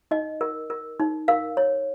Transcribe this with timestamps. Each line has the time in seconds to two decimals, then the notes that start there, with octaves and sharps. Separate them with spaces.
0.11 D#4 D#5
0.41 A#4
0.70 A#4
1.00 D#4
1.28 A#4 F5
1.57 C#5